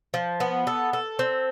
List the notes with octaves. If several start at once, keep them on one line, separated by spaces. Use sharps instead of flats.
F3
B3
A4
A4
C4